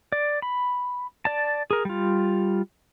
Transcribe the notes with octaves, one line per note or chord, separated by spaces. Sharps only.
D5
B5
D5 A5
G#4 A#4
G3 F4